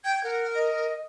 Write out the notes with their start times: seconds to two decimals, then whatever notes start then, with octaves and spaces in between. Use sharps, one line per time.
0.04 G5 G#6
0.24 A#4 F#5
0.55 D#5